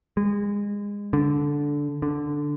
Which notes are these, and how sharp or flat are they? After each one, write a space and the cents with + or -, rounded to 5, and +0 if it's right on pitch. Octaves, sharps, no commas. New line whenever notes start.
G#3 -25
D3 -10
D3 +0